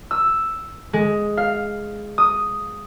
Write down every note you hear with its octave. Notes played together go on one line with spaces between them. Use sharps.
E6
G#3
F5
D#6